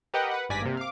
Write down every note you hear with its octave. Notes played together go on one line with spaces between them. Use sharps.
G4 A#4 B4 D#5 F#5 G5
B4 F#5
G#1 G2 D5 G#5 A#6 B6
C3 A#3
F5 D6